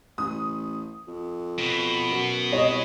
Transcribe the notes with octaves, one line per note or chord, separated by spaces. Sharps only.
A1 D#6
F2
B2
F#2
C2 C#5 D#5